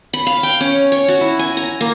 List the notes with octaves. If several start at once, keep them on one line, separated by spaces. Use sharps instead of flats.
B5
F5
G5
C#4
C#5
F#4
E4
G#5
A#5
A#3